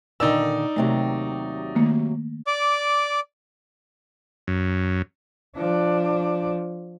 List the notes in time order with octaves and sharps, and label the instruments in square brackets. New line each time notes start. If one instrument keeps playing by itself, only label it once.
[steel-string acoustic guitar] A#2 D3 D#3 [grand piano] D#4 D5 E6
[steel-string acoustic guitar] D#2 C3 F#3 [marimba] A3
[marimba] D#3 A3 A#3
[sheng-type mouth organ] D5 D6
[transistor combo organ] F#2
[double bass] F3 D4